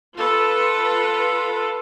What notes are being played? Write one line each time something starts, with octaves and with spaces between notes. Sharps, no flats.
F4 A4 B4